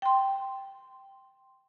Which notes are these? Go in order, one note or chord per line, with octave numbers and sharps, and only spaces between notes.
G5 C6